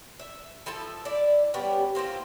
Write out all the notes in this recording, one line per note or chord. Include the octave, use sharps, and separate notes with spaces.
E5
F3 E4 A4 A5
E4 D5
G3 B3 C#4 G4
A#3 C4 E4 F4